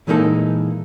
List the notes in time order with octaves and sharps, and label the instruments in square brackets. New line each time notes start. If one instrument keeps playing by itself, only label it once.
[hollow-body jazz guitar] A#2 E3 G#3 A#3 D#4 A4